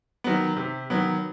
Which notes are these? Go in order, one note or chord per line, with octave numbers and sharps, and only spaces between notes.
D#3 F#3 B3
C3
D#3 F#3 B3